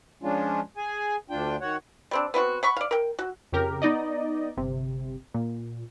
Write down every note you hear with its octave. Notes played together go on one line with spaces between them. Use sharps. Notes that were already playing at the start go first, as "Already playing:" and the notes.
F3 G#3 C#4 D4 F4
G#4 G#5
D2 D4 F4 G5
D#3 F#4 C#5 F#5
G3 C4 D4
B3 C4 F4 F#4
F#5 B5 C#6
D5 F5
A#4 G5
F#4
F2 C#3 G4 A#4
B3 D#4 D5 D#5
G1 C3
A#2